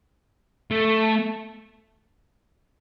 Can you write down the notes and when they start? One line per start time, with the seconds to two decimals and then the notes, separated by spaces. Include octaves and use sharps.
0.71 A3